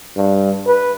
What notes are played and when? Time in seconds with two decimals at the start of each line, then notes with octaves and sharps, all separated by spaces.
0.17 G2
0.67 B4